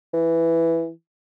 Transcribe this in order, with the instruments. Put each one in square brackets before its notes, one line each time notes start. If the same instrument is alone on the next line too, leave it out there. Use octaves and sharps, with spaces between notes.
[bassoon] E3